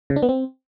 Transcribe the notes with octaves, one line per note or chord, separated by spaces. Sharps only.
C#3
D4
B3
C4